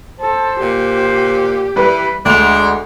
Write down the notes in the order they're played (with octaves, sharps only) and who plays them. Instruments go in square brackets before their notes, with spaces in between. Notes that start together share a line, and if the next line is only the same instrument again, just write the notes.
[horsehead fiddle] A4 [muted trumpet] C5
[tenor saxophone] A#2 [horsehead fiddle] G4
[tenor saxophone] E3 [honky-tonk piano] G3 B4
[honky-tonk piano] D2 F7 [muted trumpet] G#3 [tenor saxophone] D4